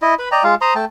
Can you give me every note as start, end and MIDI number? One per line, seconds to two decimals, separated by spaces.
0.02 0.14 64
0.02 0.14 75
0.19 0.29 71
0.19 0.29 83
0.32 0.43 74
0.32 0.43 75
0.32 0.43 79
0.32 0.43 82
0.44 0.55 56
0.44 0.55 65
0.44 0.55 77
0.61 0.74 72
0.61 0.74 82
0.61 0.74 84
0.61 0.74 87
0.75 0.85 57
0.75 0.85 79
0.75 0.85 81